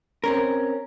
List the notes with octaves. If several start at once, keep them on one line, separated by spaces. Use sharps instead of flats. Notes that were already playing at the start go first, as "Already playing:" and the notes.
C4 C#4 A#4